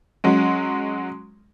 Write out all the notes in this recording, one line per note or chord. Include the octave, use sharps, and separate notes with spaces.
F#3 G#3 C#4